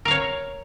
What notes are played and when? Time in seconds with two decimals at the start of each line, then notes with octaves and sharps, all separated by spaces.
0.05 A#4
0.08 F5
0.11 C#5